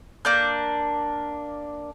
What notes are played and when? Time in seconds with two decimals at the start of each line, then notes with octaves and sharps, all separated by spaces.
0.25 A#3 D4 G6